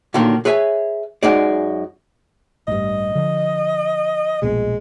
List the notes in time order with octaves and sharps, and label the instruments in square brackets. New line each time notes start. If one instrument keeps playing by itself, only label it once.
[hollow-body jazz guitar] A#2 D3 D#3 F#3 A#3
G#4 B4 C#5 E5 G#5
F#2 G#3 D#4 G#4 D5
[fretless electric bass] A1 G2 [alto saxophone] D#5
[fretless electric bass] D3 F3
[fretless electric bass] D#1 A#1 B2 [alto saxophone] G#3